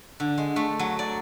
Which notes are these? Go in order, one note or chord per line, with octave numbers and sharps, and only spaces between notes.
D3
G#3
A3
F#3
D5